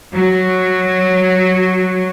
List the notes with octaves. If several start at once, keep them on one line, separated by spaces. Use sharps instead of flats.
F#3